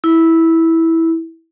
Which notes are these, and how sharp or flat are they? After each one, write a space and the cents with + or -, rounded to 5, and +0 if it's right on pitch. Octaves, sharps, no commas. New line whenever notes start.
E4 -10